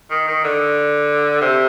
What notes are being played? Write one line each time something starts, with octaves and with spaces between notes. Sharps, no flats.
D#3
D#3
D3
C3